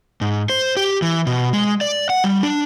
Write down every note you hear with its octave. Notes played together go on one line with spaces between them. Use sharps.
G#2
C5
G4
E3
B2
G#3
D5
F#5
G3
D4